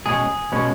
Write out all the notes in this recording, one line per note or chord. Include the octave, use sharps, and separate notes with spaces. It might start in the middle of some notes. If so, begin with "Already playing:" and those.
B2 G#3 C#4 G#4
B2 G#3 C#4